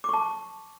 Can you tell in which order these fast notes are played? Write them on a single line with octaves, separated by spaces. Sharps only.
D6 C#6 A5